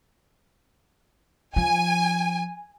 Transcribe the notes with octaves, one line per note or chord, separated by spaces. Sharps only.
F3 G#5